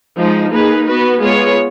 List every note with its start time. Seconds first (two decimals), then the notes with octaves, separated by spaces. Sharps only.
0.17 F3 G#3 D#4
0.52 A#3 D#4 G#4 B4
0.86 B3 F#4 B4
1.22 G#3 B3 F4 G#4 C#5